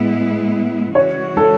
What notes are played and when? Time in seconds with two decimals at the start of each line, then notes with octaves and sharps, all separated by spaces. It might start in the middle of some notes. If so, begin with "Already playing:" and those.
Already playing: A2 G#3 B3 E4
0.95 C#3 E3 G#3 C#4 F#4 C#5
1.37 A4